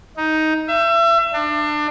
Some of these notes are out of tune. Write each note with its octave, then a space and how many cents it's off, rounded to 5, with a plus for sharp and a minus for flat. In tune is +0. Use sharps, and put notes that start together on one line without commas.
D#4 +10
E5 +30
D4 +25